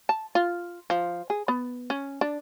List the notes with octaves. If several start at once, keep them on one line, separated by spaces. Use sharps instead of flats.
A5
F4
F3
G#4
B3
C#4
D4